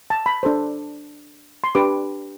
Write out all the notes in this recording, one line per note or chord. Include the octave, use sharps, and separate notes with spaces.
A5
B5
D4 A4 C5
C6
D4 G4 B4 D6